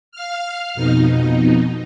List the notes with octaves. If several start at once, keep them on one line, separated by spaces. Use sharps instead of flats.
F5 F6
F2 B2 D#4